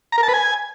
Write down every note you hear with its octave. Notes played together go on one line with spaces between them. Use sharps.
A#5
A#4
A5
B4
G#5